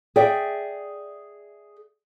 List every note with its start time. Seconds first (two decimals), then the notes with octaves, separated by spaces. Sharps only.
0.16 G#4 D5 E5 G5